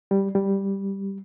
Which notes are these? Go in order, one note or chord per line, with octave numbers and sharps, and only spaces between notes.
G3
G3